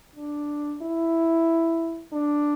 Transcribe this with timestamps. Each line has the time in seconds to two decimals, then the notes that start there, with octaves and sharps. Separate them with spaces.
0.16 D4
0.82 E4
2.13 D4